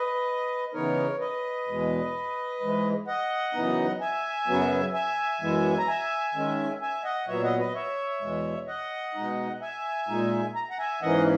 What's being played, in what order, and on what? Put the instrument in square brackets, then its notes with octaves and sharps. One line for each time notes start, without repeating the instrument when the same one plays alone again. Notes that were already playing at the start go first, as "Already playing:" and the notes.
Already playing: [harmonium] B4 D#5
C#3 E3 B3 D#4 A#4 C#5
B4 D#5
E2 B2 G#3
G#2 E3 G#3
D#5 F#5
F#2 C#3 E3 B3 D#4
E5 G#5
F#2 C#3 F#3 B3
E5 G#5
F#2 E3 G#3 B3
A#5
E5 G#5
D#3 G#3 C#4
E5 G#5
D#5 F#5
A#2 F#3 B3 C#5 E5
D#5 F#5
B4 D#5
C#5 E5
E2 B2 G#3
D#5 F#5
B2 G#3 D#4
E5 G#5
A#2 G#3 D#4
A#5
F#5 A#5
E5 G#5
G#2 E3 A#3 C#4 D#5 F#5